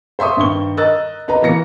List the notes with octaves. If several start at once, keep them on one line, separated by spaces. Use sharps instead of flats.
C5 E5 C6 C#6 D#6
G2 D#3 C#6 G7
A#4 D#5 E6 F#6 A6
D#4 B4 A#5
E3 A#3 A#6 C#7